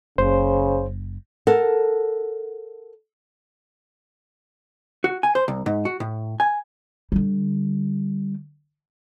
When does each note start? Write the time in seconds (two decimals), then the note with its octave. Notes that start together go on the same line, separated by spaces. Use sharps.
0.18 F#1 C#3 C5
1.47 A4 A#4 F#5
5.04 F#4
5.23 G#5
5.35 C5
5.48 C2
5.66 G#2
5.85 F#4
6.00 A2
6.40 G#5
7.12 D3 G3